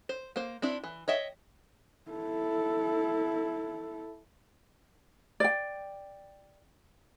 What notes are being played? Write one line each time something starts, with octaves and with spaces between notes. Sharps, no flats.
C5
A#3 C5
C4 D4 E4
E3
C#5 D#5 E5 G5
E4 A4
D5 G5